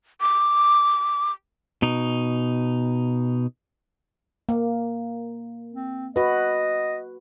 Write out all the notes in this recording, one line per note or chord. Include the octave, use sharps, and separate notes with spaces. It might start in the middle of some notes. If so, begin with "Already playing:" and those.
D6
B2 D#4
A#3
C4
F#4 B4 D#5